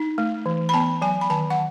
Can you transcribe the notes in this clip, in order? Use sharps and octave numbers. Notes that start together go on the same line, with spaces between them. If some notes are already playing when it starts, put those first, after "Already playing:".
Already playing: D#4
A3
E3
B5
B3 A5
F#3 G#5
B5
D#3 A5
F#5